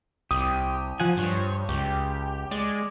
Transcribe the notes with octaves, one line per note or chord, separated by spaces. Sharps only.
C2 G4 D#6
F3 F#5 G#5
G2 C5 C#5
C#2 G4
G#3 D5